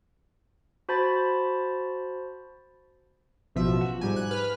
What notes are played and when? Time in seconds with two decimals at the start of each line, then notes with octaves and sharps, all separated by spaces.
0.89 F#4 C5 A5 B5 A6
3.55 A1 B2 F3 E5
3.81 F#4
4.01 G#2 G3 G#5
4.16 F#6
4.31 B4 B5 F6